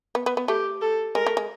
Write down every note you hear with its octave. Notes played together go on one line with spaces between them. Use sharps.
B3
B3
B3
A3 G4
A4
G#3 A#4
A3
G#3